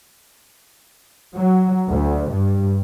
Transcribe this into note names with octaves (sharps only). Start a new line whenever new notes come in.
F#3
D2
G2